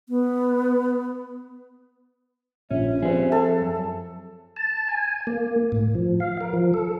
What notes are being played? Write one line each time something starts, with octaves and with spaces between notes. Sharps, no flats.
B3
A#1 C#4 E5
F3 C4 G4 G#4 C5
A4
F#2
A5
G#5
A#3
A2
F3
F5
A#4
F3
A4